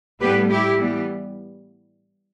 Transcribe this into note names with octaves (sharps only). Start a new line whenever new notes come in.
A2 G3 B3 G4 B4
E4 G4
E3 G3 B3